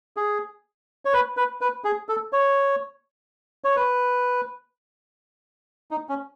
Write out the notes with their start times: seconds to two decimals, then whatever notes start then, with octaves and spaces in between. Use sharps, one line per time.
0.17 G#4
1.05 C#5
1.13 B4
1.37 B4
1.61 B4
1.84 G#4
2.09 A4
2.33 C#5
3.64 C#5
3.76 B4
5.91 D#4
6.09 C#4